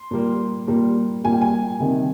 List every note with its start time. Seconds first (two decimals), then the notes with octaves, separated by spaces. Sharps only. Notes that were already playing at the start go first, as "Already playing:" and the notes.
Already playing: C6
0.11 A#2 G3 A#3
0.67 A#2 G3 A#3
1.24 A#2 G3 A#3 G#5
1.33 G5
1.41 G#5
1.80 C3 D#3 G3